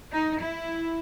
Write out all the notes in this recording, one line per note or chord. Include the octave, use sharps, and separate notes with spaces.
D#4
E4